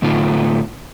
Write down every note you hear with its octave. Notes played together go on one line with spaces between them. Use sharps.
A2 D3 A3 B3 D#4 F4